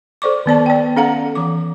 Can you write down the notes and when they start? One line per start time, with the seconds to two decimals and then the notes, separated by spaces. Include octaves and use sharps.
0.22 A4 C5 D5 C#6 D6
0.46 D#3 B3 D5 A5
0.66 D5 G5
0.96 C#4 A4 F5 F#5 A#5
1.35 E3 D6